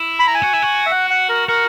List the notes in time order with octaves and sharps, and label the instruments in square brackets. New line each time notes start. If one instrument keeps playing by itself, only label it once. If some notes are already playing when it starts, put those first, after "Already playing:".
Already playing: [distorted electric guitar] E4
[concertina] B5
A#5
G#5
[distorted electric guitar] F#4
E4
F#4
[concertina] E5
F#5
F#5
A#4
[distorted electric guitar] F#4 [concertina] A#4